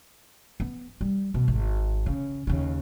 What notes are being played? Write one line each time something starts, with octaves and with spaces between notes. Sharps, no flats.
B3
G3
B2
G#1
C#3
D#2 C#3